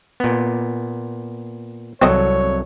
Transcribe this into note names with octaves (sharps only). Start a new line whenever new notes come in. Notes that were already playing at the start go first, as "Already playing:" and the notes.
A#2 B3
C2 F#3 C4 A4 C#5 D#5